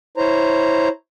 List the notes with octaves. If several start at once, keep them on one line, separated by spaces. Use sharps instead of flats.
E4 C5 C#5 A#5